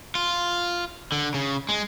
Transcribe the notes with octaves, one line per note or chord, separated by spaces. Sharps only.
F4
D3
C#3
G#3